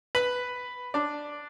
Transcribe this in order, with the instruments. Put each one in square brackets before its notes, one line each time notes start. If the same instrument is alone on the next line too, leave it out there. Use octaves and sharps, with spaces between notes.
[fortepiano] B4 B5
D4 D5